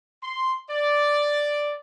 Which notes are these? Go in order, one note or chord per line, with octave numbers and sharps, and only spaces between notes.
C6
D5